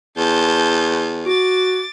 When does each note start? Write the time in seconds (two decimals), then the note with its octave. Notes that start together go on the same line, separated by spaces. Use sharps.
0.17 E2 A5 G6
1.26 F#4 D6 A6